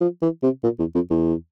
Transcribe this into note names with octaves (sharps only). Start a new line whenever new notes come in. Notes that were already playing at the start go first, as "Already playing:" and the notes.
F3
E3
C3
A#2
E2
F2
E2